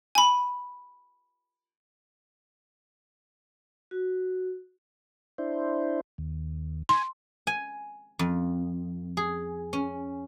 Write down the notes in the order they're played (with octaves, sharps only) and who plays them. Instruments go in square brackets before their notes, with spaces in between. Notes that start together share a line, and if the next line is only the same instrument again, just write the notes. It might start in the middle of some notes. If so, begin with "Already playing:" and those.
[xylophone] G#5 B5
[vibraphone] F#4
[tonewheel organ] D4 E4 C5
D#2
[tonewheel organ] G#5 [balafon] C6
[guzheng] G#5
F2
G#4
C#4